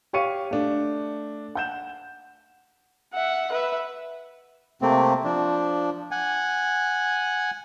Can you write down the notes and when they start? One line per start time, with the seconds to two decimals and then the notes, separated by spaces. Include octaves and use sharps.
0.13 G4 C#5 F5 C#6 C#7 D#7
0.51 A3 D4
1.55 F#5 G6 E7
3.14 E5 F#5
3.52 B4 E5
4.82 C3 A3 A#3 C4
5.24 F3 D4
6.11 F#5 G#5